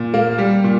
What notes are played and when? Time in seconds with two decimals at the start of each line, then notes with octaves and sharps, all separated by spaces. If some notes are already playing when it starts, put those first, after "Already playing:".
Already playing: A#2
0.14 A#3
0.38 G3
0.64 A#2